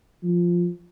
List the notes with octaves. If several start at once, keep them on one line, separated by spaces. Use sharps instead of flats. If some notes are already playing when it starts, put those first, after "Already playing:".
F3